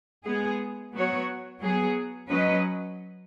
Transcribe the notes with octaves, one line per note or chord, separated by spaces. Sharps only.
G#3 B3 G#4
F#3 B3 F#4 C#5
F#3 B3 G#4
F#3 C#4 B4 D#5